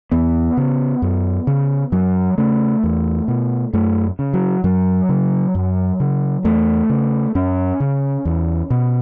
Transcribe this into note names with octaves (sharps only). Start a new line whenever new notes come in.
E2 B3
C#3
F#2
C#3
F#2 F#3
C#3 A3
E2
B2
F#2 A3
C#3
F#3
F#2 F#3
C#3
F#2
C#3
E2 A3
C#3
F#2 C#4
C#3
E2
B2